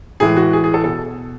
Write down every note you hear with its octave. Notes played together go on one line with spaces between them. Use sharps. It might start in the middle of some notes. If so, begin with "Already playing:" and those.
A2 E3 G#3 G#4
F#4
G#4
G#4
A4
B2 A4